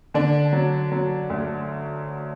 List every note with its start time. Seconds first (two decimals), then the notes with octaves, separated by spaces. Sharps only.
0.14 D3 D4
0.53 F#3
0.92 F#3
1.30 D2